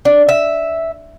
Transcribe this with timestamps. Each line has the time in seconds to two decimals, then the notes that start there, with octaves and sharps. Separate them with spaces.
0.05 D4
0.29 E5